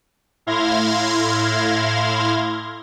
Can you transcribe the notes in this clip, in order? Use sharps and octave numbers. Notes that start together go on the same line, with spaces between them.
A2 E4 F5 C6 G#6 A#6